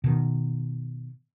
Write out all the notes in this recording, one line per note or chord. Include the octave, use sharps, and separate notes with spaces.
B2 D#3